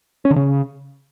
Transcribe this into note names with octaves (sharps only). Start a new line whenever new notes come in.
C#4
D3
C#3